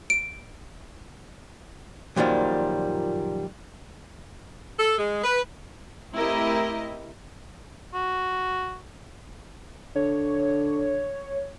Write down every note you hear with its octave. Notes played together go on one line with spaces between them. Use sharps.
D7
F#2 A#2 D#3 F3 G3
A4
G#3
B4
A3 C4 E4 G4 A#4 D#5
F#4
D3 C#5